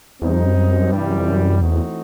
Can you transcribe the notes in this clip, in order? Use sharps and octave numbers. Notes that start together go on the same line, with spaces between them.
E2 G3 C4 D#4
F2
F#2
G2 C3 E3 G3
F#2
F2
F#2
E2 E3 A3 C4 D#4 F#4